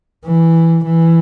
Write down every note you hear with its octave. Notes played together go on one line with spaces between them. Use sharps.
E3
E3